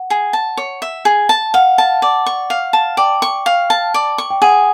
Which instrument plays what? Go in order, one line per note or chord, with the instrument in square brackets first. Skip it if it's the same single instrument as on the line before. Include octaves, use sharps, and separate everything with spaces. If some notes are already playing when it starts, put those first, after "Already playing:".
Already playing: [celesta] F#5
[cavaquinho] G#4
A5
C#5
E5
G#4
A5
[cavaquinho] F5 [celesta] F#5
[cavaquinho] A5
D5
C#6
F5
A5
[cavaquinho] D5 [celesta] G5
[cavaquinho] C#6
F5
A5
D5
C#6
[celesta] G5
[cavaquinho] G#4 [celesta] F#5